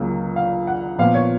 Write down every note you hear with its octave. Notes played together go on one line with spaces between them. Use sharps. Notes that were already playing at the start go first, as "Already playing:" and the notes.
Already playing: C#2 C#3 F#3 A#3
F5
F#5
A#2 F3 B3 F4 F5
C#5